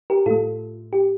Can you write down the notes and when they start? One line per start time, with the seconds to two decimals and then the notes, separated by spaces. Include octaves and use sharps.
0.10 G4 A#4
0.26 A2 A3 F4 A4
0.93 G4